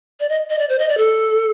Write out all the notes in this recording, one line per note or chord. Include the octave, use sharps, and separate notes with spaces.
D5
D#5
D#5
D5
C5
D#5
D5
A4